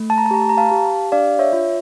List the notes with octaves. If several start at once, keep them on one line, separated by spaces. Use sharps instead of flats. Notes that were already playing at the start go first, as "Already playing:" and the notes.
Already playing: A3
A5
A#5
A5
G4 A#5
A5
A#5
F5 A5
G4
D4 D5 F5
C#5 E5
F4